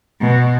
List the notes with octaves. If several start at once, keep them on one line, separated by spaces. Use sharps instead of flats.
B2